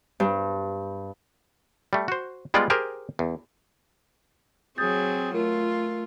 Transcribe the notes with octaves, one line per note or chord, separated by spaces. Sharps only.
G2
G3 A3
F#4 C5
G3 G#3 B3 F4 D5
G4 G#4 A#4 C5
E2
F#3 C4 G#4 D#6 G6 A6
A3 F4 A#4